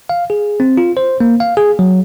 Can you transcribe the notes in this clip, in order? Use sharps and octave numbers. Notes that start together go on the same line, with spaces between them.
F5
G#4
C4
F4
C5
A#3
F5
G#4
F#3